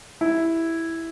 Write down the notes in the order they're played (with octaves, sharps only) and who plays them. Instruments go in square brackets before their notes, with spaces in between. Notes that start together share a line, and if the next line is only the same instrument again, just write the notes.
[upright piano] E4